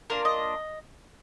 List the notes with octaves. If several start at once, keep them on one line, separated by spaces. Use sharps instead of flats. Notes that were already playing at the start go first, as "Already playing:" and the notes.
A#3 D4 F4 A#4
D#5